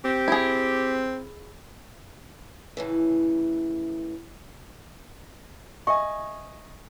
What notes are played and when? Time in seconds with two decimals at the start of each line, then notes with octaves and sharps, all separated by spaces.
0.05 C4 G4
0.28 E4 G#4
2.77 A2 C#3 E3
5.87 D#5 E5 G#5 C#6